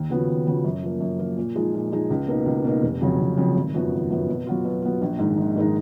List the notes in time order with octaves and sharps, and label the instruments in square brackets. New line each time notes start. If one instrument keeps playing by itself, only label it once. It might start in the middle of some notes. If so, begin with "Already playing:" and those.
Already playing: [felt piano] D#2
C#3 F3 B3 F#4
D#2
C#3 F3 B3 F#4
F#2
F3 A#3
F#2
F3 A#3
A#2
F3 G#3 D#4 G#4
A#2
F3 G#3 D#4 G#4
C#2
B2 A#3 D#4
C#2
B2 A#3 D#4
F1
F2 C#3 F#3
F1
F2 C#3 F#3
G#1
F#2 F3 B3 F#4
G#1
F#2 F3 B3 F#4
B2
F#3 B3 F4
B2
F#3 B3 F4
A#1
G#2 D#3 G#3 D#4
A#1
G#2 D#3 G#3 D#4